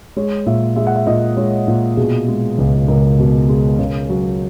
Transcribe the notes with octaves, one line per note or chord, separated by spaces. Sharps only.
G#3 C#5
A#2 E5
G#3 E5
F#5
E5
A#2 D#5
G#3 C#5
A#2
B2 G#4
G#3
C#2
C#2 A#4
B2
G#3
C#3
F#3